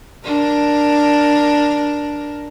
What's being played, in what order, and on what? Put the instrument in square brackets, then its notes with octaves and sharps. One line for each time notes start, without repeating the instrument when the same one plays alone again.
[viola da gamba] D4 A#4